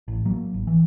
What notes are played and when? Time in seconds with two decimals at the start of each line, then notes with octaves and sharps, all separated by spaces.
0.08 A1
0.25 F#3 A#3
0.54 G#1
0.67 E3